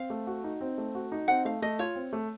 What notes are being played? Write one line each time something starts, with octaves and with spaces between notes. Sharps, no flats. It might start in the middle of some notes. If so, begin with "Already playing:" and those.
Already playing: C4 F5
A3
F#4
D#4
C4
A3
F#4
D#4
C4 F#5
A3 F5
A3 D#5
F4 C#5
C4
A3